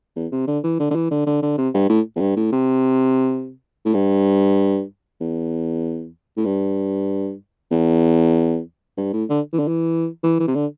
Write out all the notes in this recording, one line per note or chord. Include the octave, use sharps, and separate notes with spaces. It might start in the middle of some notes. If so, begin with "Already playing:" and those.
E2
C3
D3
E3
D3
D3
E3
D3
D3
D3
C3
G2
A2
E2
G2
A2
C3
A2
G2
E2
A2
G2
E2
G2
A2
D3
E3
D3
E3
E3
E3
C3
D3